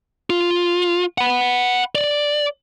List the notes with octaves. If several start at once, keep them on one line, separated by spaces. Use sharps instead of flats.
F4
F#5 B5
D5